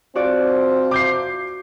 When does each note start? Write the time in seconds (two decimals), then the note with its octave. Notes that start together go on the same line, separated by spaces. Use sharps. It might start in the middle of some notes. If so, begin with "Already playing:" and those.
0.15 F3 C4 F#4 D5
0.91 D6 G6 C7